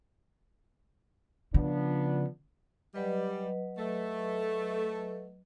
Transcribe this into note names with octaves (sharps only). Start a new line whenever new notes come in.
C#3 F3 B3 D4
F#3 G3 B4 D#5
A3